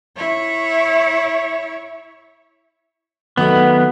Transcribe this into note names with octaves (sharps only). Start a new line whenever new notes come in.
E4 C#5
D#3 F#3 A3 B3